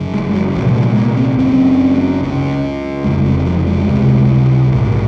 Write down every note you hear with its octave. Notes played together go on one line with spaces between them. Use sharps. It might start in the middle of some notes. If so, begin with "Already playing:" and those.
Already playing: F#1 F#2 C#3
G#3
F#3
C2 A#2 F3
G#3
A#3
C4
F#1 F#2 C#3 C4
C#2 C#3
F1 F2 C#3 G#3
C4
F3
G#3
C#2 C3
A#1 G#2